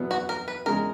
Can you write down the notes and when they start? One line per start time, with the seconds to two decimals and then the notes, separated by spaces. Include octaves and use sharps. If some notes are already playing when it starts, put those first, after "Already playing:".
Already playing: E2 B2 F#3 B3
0.11 F#4
0.29 A#4
0.48 B4
0.66 E2 C#3 G#3 A#4